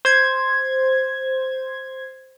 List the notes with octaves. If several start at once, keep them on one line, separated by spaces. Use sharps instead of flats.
C5 G#6